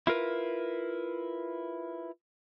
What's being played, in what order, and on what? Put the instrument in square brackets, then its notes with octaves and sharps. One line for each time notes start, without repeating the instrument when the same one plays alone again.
[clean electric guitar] E4 F4 A#4 B4